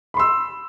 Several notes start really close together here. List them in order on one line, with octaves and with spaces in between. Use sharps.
B5 C6 E6